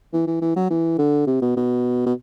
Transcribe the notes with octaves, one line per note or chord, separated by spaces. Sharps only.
E3
E3
E3
F#3
E3
D3
C3
B2
B2
B2